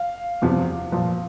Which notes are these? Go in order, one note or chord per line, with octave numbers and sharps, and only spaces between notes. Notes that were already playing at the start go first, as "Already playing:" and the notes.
Already playing: F5
E2 C3 F3
A#2 F3